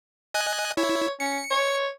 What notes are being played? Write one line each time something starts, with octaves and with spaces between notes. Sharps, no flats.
D#5 G#5 F#6
E4 C#5
C#4 C#7
C#5